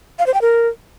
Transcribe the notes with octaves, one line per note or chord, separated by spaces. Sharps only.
F5
C5
G5
A#4